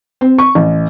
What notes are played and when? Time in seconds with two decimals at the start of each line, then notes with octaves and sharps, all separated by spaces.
0.21 C4
0.39 C#6
0.55 A1